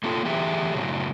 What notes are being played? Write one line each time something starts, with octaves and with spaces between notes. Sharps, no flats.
A3 A#3 F4 A4
E3 A3 G4 G#4 E5
A2 C#3 F#3